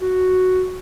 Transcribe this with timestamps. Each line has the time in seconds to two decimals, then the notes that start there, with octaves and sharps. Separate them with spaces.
0.01 F#4